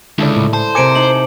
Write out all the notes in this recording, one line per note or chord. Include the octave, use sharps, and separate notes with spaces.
C#2 D3 E4 A4 D5
A2
C5 A5
C3 A#4 G#5 D6 C#7 D7
D#4 F#7